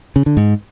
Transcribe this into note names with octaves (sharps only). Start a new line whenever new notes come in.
C#3
D3
G#2